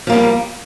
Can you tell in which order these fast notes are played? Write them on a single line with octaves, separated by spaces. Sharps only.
F3 A#3 G3